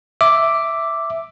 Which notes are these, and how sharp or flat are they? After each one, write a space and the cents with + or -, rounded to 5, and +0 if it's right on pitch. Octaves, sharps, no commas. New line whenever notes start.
E5 +0 D6 +0